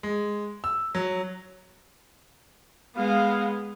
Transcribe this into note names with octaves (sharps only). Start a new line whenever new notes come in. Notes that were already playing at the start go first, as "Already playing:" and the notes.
G#3
E6
F#3
G#3 B3 F5